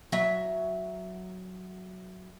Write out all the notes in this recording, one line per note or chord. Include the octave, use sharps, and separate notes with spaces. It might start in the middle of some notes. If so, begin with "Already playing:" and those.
F#3 E5